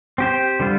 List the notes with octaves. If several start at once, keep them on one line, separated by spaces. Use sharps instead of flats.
C4 G4 C5
D3 G3 F4